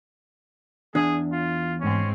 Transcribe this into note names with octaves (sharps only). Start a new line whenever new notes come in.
E2 D4 G#4
F4
G#2 C4 C#4